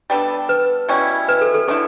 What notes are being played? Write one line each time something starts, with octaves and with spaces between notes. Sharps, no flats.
G3 B3 D4 A4
B4
B2 G3 C#4 E4
B4
A4
A4
D3 A3 E4 A4